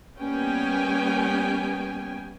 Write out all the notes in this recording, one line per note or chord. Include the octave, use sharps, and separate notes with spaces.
G3 A#3 B3 C#4 G5 G#5